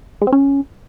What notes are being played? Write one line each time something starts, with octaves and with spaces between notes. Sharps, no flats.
G#3
C4
C#4